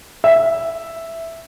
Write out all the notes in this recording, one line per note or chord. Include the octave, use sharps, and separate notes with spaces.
E5